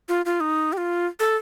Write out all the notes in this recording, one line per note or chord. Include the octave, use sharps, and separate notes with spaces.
F4
F4
D#4
G4
F4
A4